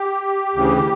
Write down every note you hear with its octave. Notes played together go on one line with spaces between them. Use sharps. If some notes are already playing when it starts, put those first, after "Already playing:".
Already playing: G4
D2 C#3 E3